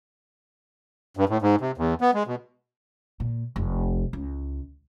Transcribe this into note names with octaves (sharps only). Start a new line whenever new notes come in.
G2
A2
G#2
C3
E2
B3
G#3
B2
A#2
F1
C#2